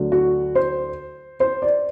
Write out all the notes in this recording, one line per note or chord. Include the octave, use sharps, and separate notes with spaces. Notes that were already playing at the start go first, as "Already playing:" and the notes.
Already playing: D2 D3 F#3
F#4
C5
C5
D5